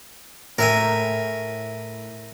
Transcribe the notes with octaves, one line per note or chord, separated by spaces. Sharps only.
A2 A#4 E5 G#5